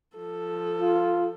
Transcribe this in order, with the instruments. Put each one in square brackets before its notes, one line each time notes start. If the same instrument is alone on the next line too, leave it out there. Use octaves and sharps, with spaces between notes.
[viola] F3 A4
[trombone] F4